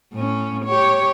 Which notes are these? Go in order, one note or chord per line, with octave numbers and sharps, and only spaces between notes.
A2 C#4
G4 C#5